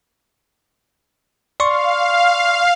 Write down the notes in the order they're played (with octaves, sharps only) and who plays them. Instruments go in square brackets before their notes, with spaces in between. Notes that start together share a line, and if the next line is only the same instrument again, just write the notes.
[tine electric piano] D5 C6 C#6 [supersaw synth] F5